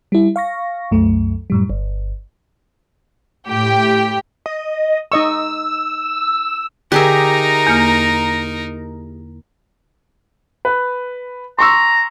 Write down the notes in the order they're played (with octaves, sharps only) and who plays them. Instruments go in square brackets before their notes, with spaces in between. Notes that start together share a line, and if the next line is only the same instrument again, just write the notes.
[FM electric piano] G3 E4
F5 C#6 A#6
C2 F#2 A3
F#2 A2 G3
G1
[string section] A2 G4 G5
[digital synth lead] D#5
[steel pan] D#4 D#5 C#6 [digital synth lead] E6
[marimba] D3 [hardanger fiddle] D#4 A#4 [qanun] G4 G#4 E5
[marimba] E2 A#3 F6
[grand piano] B4
[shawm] A#5 [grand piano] C6 C#6 E6